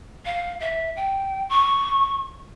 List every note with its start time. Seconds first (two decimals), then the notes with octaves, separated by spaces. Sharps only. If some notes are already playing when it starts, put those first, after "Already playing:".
0.25 F5
0.60 E5
0.96 G5
1.49 C#6